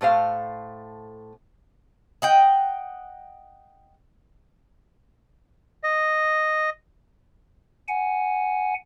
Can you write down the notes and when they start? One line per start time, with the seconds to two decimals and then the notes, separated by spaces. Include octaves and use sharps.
0.01 A2 A3 C5 F5
2.22 D#5 F#5 G5
5.83 D#5
7.88 F#5 G#5